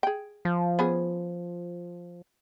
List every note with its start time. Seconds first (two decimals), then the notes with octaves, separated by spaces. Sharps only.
0.03 G#4 G5
0.45 F3
0.79 B3 C#4 G#4